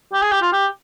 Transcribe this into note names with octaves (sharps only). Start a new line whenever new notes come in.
G4
G#4
G4
F4
G4